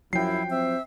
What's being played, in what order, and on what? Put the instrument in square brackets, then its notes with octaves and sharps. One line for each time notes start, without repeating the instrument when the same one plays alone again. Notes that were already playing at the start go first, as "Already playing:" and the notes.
[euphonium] F#2 [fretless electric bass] F3 F#3 [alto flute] E4 [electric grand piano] G5 C7
[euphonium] C4 [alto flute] E5